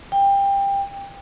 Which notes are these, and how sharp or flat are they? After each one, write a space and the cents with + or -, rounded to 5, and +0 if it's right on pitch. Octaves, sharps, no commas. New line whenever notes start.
G5 +20